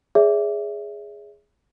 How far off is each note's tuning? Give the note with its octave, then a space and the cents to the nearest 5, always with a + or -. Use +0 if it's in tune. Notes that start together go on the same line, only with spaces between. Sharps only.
G#4 +0 C#5 +45 E5 +0